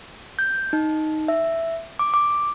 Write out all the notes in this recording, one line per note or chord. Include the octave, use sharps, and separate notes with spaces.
G6
D#4
E5
D6
D6